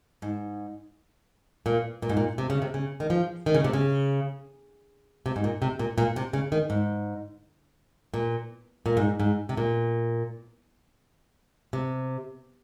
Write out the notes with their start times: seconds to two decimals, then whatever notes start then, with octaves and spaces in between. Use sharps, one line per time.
0.22 G#2
1.66 A#2
2.02 A#2
2.09 G#2
2.17 A#2
2.38 C3
2.50 C#3
2.62 C3
2.74 C#3
3.00 D#3
3.10 F3
3.46 D#3
3.55 C#3
3.64 C3
3.73 C#3
5.26 C3
5.36 G#2
5.44 A#2
5.62 C3
5.79 A#2
5.98 A#2
6.16 C3
6.33 C#3
6.52 D#3
6.70 G#2
8.14 A#2
8.86 A#2
8.97 G#2
9.20 G#2
9.49 C3
9.57 A#2
11.73 C3